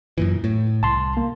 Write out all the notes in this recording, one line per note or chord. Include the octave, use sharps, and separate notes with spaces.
F#2 A#2 E3
A2
C2 A5 C6
A#3